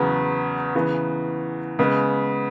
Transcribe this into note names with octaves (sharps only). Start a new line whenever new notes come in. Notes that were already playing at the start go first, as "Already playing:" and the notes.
Already playing: E2 C#3 F#3 B3
C#3 E3 B3
C#3 G#3 B3